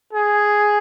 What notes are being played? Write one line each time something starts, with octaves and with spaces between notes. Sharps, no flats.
G#4